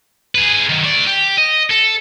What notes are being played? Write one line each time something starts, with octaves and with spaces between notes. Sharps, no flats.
G#4 B4
D#3 F#3
A3 D5
G4
D#5
A4